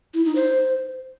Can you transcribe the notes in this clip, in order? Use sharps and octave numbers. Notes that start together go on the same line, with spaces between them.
E4
D#4
C5